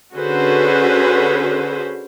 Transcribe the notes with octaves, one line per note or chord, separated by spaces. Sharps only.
D3 C#4 F#4 G#4 B4 C5